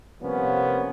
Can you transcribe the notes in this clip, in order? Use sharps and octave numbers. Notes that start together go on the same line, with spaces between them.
C3 F3 G3 A#3 B3 C#4